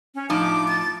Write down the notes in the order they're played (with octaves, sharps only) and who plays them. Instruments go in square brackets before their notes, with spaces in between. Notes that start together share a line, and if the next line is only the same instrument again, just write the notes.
[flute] C#4
[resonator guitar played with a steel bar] A2 F3 D#4 [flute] D6
[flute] A6